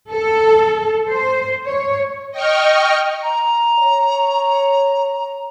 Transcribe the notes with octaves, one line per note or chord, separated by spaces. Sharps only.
A4
C5
C#5
D#5 G5 C#6 F6
A#5
C#5